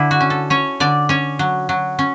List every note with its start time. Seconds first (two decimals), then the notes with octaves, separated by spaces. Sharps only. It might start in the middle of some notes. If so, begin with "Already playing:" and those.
Already playing: D3 E4
0.11 F#4
0.21 C#4
0.30 A4
0.50 C#4 C#5
0.80 D3 D5
1.09 C#4 C#5
1.39 F#3
1.69 F#3
1.99 C#4